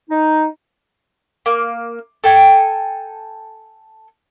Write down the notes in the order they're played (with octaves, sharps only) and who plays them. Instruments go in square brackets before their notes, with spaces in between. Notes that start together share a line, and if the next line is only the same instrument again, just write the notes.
[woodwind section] D#4
[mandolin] A#3
A4 G5 G#5